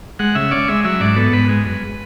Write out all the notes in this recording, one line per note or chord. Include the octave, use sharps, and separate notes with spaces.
G#3 F#5
C#3 E5
C#4 D5
G#3 E5
F#3 E5
G#2 D5
B3 A4
G#2 B4
G#3
F#2